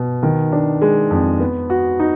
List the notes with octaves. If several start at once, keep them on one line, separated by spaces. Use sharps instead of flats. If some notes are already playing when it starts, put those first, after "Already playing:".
Already playing: B2
D#3
D4
G#3
F2
B3
F#4
D#4